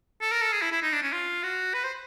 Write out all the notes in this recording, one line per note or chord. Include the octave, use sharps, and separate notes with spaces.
A4
A#4
A4
G#4
E4
E4
D#4
D4
C#4
F4
F#4
B4
C5